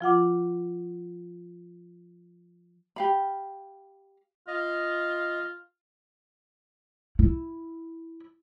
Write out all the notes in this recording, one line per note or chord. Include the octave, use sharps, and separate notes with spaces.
F3 F4 F#5 D6
G4 F5 B5
F4 D#5
E4